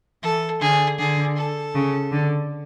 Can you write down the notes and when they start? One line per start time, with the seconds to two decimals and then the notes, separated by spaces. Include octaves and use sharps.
0.23 E3 A4
0.61 D3 G#4
0.99 D3 G#4
1.37 A4
1.75 C#3
2.12 D3